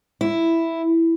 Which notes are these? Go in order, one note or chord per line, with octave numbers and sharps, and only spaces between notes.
E4